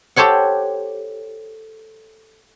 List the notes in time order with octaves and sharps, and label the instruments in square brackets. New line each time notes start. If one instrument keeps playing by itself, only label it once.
[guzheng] G4 A4 C5 C#5 F#5